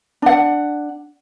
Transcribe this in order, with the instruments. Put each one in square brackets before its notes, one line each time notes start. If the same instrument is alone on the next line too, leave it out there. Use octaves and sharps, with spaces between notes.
[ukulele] D4 F#5